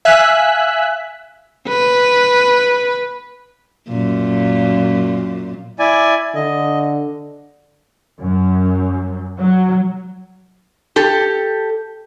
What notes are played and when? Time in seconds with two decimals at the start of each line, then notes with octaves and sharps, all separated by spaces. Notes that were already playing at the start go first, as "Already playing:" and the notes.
0.05 E5 F5 G#5 E6 F#6 B6
1.68 B4
3.89 F#2 A#2
5.79 E4 D5 G#5
6.35 D3 D#5
8.19 F#2
9.39 F#3
10.96 G4 A4